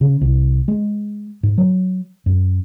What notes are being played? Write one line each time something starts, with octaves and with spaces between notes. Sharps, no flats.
C#3
C2
G#3
G#2
F#3
F#2